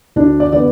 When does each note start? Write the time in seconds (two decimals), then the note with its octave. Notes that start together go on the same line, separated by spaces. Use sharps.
0.16 D2 D4
0.40 D5
0.52 D3 B3 D5